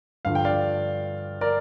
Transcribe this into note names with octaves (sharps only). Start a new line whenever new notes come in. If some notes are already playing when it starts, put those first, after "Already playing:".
G2 D3 F3 F5
G5
D5 F5
A#4 D5